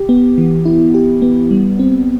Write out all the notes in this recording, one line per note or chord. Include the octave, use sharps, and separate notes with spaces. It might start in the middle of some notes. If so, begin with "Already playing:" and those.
Already playing: G4
B3
E3
E4
G4
B3
G3
C4